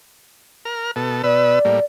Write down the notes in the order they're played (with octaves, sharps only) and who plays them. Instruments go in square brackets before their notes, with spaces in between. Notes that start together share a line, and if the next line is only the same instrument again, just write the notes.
[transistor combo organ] A#4 F6
B2 A4
[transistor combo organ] B2 B4 E6 [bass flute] D5
[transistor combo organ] A2 G3 A#3